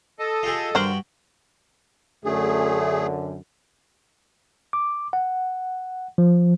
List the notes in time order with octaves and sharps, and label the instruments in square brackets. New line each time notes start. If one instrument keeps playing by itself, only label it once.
[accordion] A4 D#5
[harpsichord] F4 G4 G#4
[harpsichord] G2 F#4 G5 [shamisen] D3 A#4 C5
[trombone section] F#2 D3 [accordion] A3 G#4
[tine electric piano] D6
F#5
F3